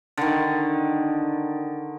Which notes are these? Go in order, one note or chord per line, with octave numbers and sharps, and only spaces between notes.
D3 D#3